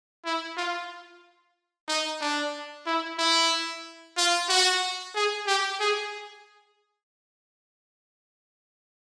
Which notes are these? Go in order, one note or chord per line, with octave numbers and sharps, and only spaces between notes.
E4
F4
D#4
D4
E4
E4
F4
F#4
G#4
G4
G#4